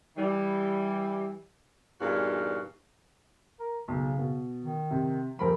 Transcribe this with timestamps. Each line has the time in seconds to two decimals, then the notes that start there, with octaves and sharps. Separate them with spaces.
0.16 E3 G3
2.01 E2 G2 A#2 D#4 F#4 F5
3.60 A#4
3.88 B1 C#3
4.18 B2
4.65 D#3
4.91 C3
5.39 D#1 F3 A#4 B5